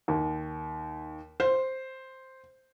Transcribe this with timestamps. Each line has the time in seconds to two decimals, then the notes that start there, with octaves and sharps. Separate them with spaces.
0.08 D#2
1.40 C5